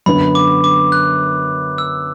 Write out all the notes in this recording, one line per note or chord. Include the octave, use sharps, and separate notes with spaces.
F#2 D3 B3 B5
D6
D6
F#6
E6